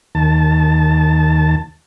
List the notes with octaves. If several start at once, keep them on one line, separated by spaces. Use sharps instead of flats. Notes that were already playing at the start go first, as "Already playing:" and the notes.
D#2 A5